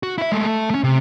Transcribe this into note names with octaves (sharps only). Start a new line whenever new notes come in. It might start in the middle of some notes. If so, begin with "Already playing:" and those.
F#4
E4 E5
G#3 A3
A3
A3 C#4
C3